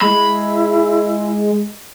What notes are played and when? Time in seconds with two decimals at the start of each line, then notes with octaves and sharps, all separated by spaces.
0.01 G#3 E4 B5